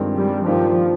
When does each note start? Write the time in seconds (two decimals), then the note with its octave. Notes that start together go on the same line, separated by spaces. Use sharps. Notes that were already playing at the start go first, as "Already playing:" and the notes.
Already playing: G2 D#3 G#3 C4 F4
0.15 G3
0.46 G2 D#3 F3 A#3 D4 G4